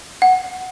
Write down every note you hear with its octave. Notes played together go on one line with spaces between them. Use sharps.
F#5